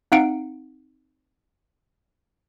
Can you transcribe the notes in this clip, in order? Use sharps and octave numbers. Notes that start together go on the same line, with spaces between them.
C4 D#4 F5 F#5 D7